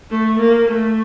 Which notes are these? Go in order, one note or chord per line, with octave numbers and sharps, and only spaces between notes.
A3
A#3
A3